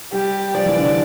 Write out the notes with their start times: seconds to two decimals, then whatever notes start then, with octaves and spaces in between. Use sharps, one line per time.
0.12 G3 G4
0.54 F3 D5
0.66 E3
0.78 D3